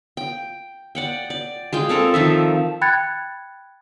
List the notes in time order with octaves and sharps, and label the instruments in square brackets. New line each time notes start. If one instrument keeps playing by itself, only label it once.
[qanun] G5
D5 F#5 G5
D5
G#3 F4 G5
C4 A4 A#4
D#3 F3 E5
[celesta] G5 B5 F#6 G#6 A6 C#7